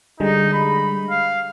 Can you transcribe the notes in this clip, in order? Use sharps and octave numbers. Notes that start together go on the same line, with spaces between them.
D3 G3 G#3 D#4
B5
F5